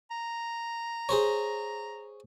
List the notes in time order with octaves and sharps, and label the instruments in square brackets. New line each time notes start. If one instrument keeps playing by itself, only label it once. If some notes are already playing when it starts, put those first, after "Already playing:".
[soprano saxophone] A#5
[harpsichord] G#4 C5 C#5